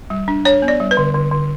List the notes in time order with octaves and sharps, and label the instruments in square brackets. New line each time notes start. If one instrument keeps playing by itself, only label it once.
[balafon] G3
D4
D4 C#5
B3
D5
G3
B4
D3
D3
D3